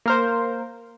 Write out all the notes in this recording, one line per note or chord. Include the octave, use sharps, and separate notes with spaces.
A#3 A#4 C5